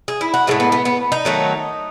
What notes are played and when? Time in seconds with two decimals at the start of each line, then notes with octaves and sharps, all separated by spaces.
0.08 G#4
0.21 E4
0.34 F#4
0.47 A2 E3 G#3 A3
0.60 B3
0.72 B3
0.85 B3
1.12 D#4
1.25 D#3 F#3 A3